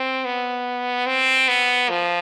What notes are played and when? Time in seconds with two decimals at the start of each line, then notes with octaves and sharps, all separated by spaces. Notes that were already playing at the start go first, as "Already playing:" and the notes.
Already playing: C4
0.25 B3
1.07 C4
1.48 B3
1.90 F3